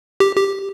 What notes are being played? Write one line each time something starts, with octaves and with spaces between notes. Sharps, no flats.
G4
G4